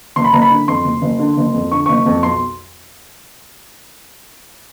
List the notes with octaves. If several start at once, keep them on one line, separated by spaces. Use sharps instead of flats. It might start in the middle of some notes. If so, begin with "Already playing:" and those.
F#1 C6
B5
F#1 A#5
B5
D3
F2 C6
F#1
F#1
D3
F#1
F2
D3 C#6
F#1 C#6
F2
B1 C6